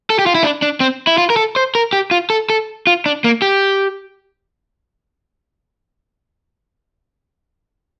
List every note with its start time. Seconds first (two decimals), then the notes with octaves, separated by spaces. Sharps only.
0.10 A4
0.19 G4
0.26 F4
0.35 E4
0.44 D4
0.62 D4
0.80 C4
1.07 E4
1.18 F4
1.30 A#4
1.36 A4
1.56 C5
1.75 A#4
1.93 G4
2.11 F4
2.30 A4
2.50 A4
2.87 F4
3.06 D4
3.24 A#3
3.42 G4